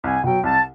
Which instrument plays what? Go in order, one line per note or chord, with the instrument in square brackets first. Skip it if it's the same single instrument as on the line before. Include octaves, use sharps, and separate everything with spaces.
[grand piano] C2 [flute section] G#5
[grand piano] B2 F#3 [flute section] G5
[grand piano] C2 [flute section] A5